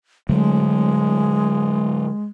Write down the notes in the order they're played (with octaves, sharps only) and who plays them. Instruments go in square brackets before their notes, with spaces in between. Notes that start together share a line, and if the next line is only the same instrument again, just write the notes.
[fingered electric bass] D3 F#3 A3 [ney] G#3